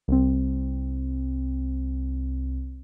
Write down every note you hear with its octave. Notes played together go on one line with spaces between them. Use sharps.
C2 C4